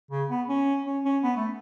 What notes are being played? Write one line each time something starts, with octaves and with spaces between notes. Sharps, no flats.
C#3
B3
C#4
C#4
C#4
B3
A3